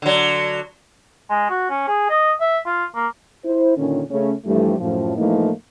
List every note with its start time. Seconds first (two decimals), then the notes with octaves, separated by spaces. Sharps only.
0.02 D3 F#3
1.30 G#3
1.50 F#4
1.70 C#4
1.88 G#4
2.10 D#5
2.41 E5
2.66 F4
2.95 A#3
3.45 E4 C5
3.76 A#2 D3 D#3 C#4
4.10 C#3 A3 C#4
4.46 G2 E3 F3 G3 A3
4.79 F#2 A2 F3
5.17 A2 E3 F3 A3 A#3 D#4